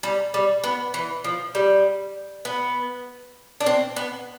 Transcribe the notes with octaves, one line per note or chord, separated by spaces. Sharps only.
G3
G3
B3
E3
F3
G3
B3
D4
C4
B3